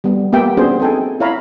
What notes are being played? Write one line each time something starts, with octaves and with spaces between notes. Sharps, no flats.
G3 B3
A#3 B3 G4 E5 G5
B3 C#4 D4 F#4 G#4 C5
C4 D#4 A4 G5 G#5
E4 C#5 E5 F5 A#5 B5